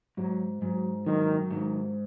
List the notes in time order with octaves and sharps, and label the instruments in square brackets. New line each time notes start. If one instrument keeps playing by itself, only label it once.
[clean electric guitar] G#2 [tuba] F#3
[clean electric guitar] G#2 [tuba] F#3
[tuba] D#3 [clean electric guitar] F#3
[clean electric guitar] G#2 [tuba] D#3